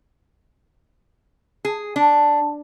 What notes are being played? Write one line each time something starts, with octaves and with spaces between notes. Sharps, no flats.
G#4
D4